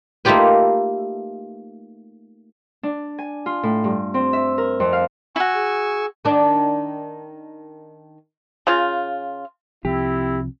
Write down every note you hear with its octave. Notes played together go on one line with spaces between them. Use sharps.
A3 A#3 D#4 F4 G4 B4
D4
G#5
F4
A2
G2
C4
E5
A#4
F2
F5
E4 F#4 G#5 C#6 E6
G#4
D#3 D4
C#3 F4
C2 C3 F3 C4 E4 G4